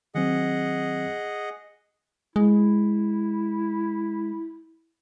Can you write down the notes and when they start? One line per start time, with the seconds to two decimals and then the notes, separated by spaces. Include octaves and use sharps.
0.15 D#3 F#3 C4 G#4 D#5 F#5
2.36 G#3 E4